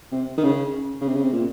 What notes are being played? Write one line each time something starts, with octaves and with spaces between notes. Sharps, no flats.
C3
D#3
C#3
C#3
C3
C#3
C3
A#2